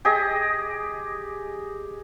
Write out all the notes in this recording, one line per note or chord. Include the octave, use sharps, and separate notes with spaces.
G4 G#4 D#5